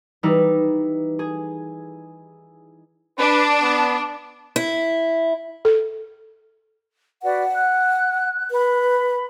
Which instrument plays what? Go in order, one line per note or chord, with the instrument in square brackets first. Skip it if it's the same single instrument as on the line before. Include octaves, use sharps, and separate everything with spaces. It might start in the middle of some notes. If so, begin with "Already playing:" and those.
[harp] E3 G3 D#4 E4
G#4
[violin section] D4 [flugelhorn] B4
[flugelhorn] B3
[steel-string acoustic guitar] E4
[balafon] A4
[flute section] F#4 B4 D5 [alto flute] F#5
[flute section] F#6
[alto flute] B4 [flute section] B5